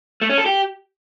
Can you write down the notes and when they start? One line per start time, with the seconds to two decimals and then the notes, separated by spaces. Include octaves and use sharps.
0.22 A3
0.30 C#4
0.38 A4
0.46 G4